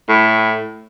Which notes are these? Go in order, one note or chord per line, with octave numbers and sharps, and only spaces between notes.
A2